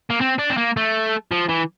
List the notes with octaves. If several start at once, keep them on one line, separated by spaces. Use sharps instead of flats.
A#3
C4
D4
C4
A#3
A3
F3
E3